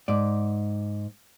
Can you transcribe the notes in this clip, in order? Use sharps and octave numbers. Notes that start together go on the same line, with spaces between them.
G#2 D5